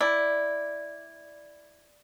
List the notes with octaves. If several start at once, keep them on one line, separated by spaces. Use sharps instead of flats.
E4 D5